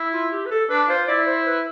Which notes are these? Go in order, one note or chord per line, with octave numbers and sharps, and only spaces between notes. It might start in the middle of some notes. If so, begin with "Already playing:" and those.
Already playing: E4
F4
G4
B4
A4
D4 B4
F4 C5
E4 D5
C5
B4